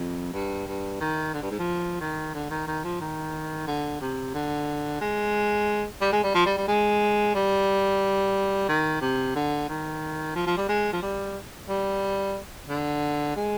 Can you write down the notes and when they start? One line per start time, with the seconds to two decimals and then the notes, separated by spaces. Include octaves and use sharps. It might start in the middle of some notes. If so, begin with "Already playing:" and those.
Already playing: F2
0.33 G2
0.67 G2
1.01 D#3
1.34 D3
1.43 G2
1.51 G#2
1.59 F3
2.00 D#3
2.34 D3
2.50 D#3
2.68 D#3
2.84 F3
3.01 D#3
3.67 D3
4.01 C3
4.34 D3
5.01 G#3
6.01 G3
6.12 G#3
6.24 G3
6.35 F3
6.46 G3
6.57 G3
6.68 G#3
7.35 G3
8.69 D#3
9.01 C3
9.36 D3
9.69 D#3
10.35 F3
10.47 F3
10.57 G3
10.69 G#3
10.93 F3
11.02 G3
11.69 G3
12.69 D3
13.36 G#3